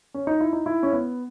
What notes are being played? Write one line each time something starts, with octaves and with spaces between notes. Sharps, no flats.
C#4
D#4
E4
D#4
E4
C#4
B3